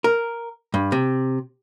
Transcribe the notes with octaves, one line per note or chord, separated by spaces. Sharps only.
A#4
G2
C3